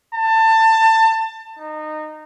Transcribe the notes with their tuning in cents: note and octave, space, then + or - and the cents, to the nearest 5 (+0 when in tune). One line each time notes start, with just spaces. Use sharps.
A5 +25
D#4 -20